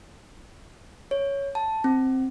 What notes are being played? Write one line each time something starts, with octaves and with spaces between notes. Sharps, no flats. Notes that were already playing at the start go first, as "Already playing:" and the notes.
C#5
A5
C4